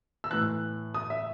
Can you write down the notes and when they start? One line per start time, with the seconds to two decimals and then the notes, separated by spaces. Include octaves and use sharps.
0.24 E6
0.31 A2 E3 F#6
0.94 D#6
1.10 E5